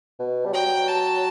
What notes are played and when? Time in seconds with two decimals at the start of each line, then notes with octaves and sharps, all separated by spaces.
0.20 B2
0.46 G3
0.53 F#3 G5
0.88 A5